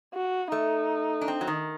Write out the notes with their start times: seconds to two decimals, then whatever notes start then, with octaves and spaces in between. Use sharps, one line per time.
0.14 F#4
0.52 A3 D#4
1.21 D4
1.28 C4
1.41 F#3
1.47 D#3